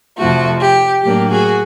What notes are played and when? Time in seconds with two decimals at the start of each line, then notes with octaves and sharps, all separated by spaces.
0.17 F2 C3 F3 A3 F#4
0.60 G4
1.02 A2 F#3 A#3 D4 G4
1.30 F#4 G#4